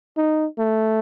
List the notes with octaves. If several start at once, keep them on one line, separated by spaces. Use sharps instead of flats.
D#4
A3